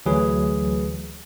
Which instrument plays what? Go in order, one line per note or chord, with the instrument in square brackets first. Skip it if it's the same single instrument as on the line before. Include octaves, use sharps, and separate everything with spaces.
[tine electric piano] D2 E3 F#3 G#4 B4